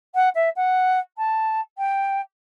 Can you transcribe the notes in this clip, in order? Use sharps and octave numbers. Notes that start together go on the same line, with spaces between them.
F#5
E5
F#5
A5
G5